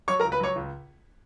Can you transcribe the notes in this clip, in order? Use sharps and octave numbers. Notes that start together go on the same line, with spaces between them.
F#3 C#5 C#6
A#4 A#5
C#2
B4 B5
F#3 C#5 C#6
C#2